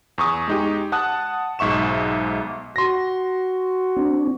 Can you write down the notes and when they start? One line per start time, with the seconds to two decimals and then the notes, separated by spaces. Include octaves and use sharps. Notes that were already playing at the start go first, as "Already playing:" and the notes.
0.18 E2 C#6 D#6
0.48 G#3 D#4 G4
0.92 F#5 A5 D#6 F#6
1.59 B1 G#2 E5 C#6 E7
2.76 F#4 C6 A#6
3.97 C4 D4